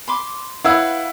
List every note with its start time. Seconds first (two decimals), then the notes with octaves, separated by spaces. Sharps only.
0.08 B5 C6 D6
0.64 E4 B4 C#5 F5 F#5 E6